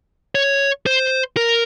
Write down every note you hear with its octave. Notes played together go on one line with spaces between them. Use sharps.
C#5
C5
A#4